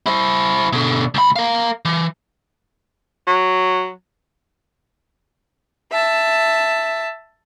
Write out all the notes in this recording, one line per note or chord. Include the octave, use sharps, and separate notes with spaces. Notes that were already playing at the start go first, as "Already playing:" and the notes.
E4 C5
B2 D3
C#2 B5
A#4 F5
E3
F#3
E5 A5